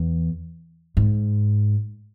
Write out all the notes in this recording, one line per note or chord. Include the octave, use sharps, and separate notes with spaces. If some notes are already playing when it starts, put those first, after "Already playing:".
Already playing: E2
G#2